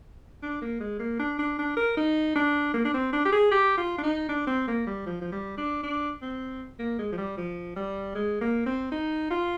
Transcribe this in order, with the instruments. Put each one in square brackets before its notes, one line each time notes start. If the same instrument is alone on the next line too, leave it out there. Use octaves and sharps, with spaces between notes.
[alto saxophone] D4
A#3
G#3
A#3
D4
D4
D4
A#4
D#4
D4
A#3
D4
C4
D4
G4
G#4
G4
F4
D4
D#4
D4
C4
A#3
G3
F3
F3
G3
D4
D4
C4
A#3
G#3
F3
G3
F3
G3
G#3
A#3
C4
D#4
F4